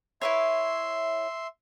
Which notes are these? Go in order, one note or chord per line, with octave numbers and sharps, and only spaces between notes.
E4 B4 C#5 E5 C6